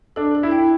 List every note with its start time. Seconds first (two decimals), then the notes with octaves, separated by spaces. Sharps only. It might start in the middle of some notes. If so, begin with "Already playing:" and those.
0.16 D4 A4
0.35 A4
0.43 E4
0.51 G5